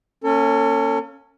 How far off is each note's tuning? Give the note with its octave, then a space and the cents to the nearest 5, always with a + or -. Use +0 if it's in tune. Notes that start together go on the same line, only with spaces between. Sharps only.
A#3 +0 C#4 +0 A4 +35